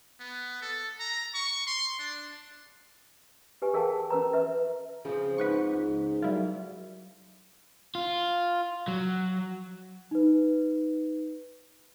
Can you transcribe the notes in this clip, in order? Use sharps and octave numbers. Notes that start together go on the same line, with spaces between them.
B3
A4
A#5
C#6
C6
D4
G4 B4 G#5
G#4 A#4 F5 G5 A5
C#4 A#4 B4 A#5
B4 E5
C#3 F3 C4
G#2 B4 F#5 C#6
C#2
F#3 G3 E4 F4 A#4
F4
F#3
D#4 B4